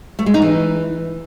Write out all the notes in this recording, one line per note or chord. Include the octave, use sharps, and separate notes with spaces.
A3
G#3
D#4
E3